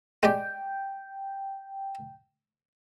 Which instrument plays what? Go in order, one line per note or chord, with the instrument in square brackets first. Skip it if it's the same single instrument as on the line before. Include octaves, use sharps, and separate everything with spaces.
[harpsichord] G#3 G4 D5 [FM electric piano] G5